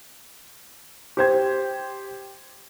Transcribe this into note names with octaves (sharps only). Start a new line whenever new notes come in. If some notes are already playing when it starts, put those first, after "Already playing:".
G4 C5 G#6